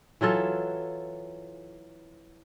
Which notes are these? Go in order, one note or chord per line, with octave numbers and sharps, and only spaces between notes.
E3 F#3 F4 A4